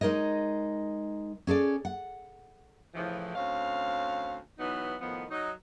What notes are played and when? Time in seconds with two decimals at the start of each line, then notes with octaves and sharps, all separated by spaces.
0.01 G#3 D#4 A#4 C#5 D#5
1.47 C#4 G#4 A4 D5
1.85 F#5
2.95 A2 C#3 E3 F3
3.35 D2 C4 C#4 F5
4.59 E3 F#3 B3 D#4
5.01 A2 D#3 F3 B3
5.31 F#3 D#4